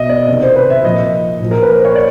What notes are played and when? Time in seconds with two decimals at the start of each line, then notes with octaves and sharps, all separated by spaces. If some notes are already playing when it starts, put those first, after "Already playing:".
Already playing: B2 D#5 E5
0.09 D5
0.28 C3 D#3
0.42 C5
0.56 B4
0.70 E5
0.84 A#2 F3 D#5
1.40 A#2 F3
1.51 A#4
1.62 B4
1.74 C5
1.85 C#5
1.95 D5